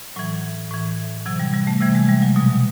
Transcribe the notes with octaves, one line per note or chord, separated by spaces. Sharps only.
A2 E3 F#3
A2 E3
C3 E3 F#3
G3
G3
A3
C3 E3 G3
G#3
G3
F#3
B2 F#3